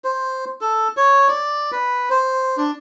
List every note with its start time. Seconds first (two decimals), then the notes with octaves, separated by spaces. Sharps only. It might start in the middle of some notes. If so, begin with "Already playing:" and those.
0.04 C5
0.61 A4
0.97 C#5
1.28 D5
1.72 B4
2.10 C5
2.57 D4